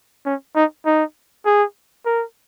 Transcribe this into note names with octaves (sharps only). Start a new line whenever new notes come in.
C#4
D#4
D#4
G#4
A#4